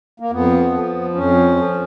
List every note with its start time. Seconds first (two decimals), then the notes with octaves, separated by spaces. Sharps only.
0.20 A#3
0.31 F2 B3
0.73 F3
1.14 F2 C#4
1.56 F3